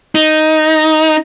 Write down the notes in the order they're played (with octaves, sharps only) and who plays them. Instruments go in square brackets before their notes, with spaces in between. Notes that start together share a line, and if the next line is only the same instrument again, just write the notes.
[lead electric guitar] D#4